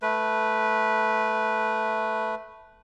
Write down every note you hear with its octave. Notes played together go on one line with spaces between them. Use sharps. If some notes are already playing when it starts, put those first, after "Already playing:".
A3 B4